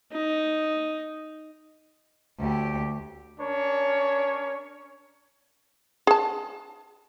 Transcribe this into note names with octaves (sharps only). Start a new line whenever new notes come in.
D#4
D2 G4
C#4 D4 A#4 C#5
G#4 A5